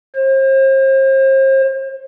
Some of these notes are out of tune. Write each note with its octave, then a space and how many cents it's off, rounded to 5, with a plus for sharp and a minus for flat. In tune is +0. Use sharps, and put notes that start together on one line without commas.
C5 +40